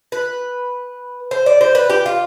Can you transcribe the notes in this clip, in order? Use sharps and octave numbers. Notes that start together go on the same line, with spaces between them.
B4
C5
D5
C5
B4
G4
F4